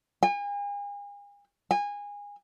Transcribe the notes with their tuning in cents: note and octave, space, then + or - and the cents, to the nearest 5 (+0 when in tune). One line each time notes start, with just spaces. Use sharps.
G#5 -40
G#5 -25